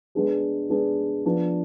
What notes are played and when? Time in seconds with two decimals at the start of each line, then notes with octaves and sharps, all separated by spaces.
0.15 G#3 B3 D4 G#4
0.70 G#3 B3 D4 G#4
1.25 F3 B3 D4